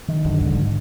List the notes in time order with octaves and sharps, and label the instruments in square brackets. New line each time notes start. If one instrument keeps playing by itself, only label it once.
[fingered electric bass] D#3
[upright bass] F#2 [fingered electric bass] D3
[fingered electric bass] E1 [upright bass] G#2